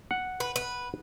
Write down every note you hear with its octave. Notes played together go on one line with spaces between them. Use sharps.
F#5
B4
B4